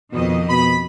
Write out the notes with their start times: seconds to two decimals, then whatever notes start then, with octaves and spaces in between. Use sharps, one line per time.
0.12 F2 B2 D#3 D#5
0.49 B2 B5